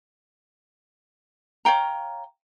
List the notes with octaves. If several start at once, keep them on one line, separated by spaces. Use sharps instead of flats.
C#5 F5 G5 A#5